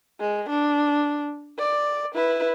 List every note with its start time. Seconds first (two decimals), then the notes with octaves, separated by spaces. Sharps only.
0.20 G#3
0.50 D4
1.59 D5
2.15 E4 B4